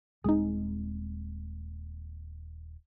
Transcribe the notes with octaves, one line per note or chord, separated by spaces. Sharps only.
D#1 G#3 C4 D#4 G#4